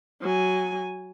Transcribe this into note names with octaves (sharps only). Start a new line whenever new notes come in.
F#3 G#5